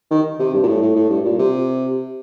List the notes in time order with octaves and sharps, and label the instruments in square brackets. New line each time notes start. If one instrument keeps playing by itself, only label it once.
[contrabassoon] D#3
C3
G2
A#2
A2
A2
A2
G2
A#2
C3